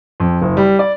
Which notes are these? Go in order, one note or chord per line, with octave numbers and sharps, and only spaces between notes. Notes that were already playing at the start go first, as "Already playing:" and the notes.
F2
F#1
G3
D5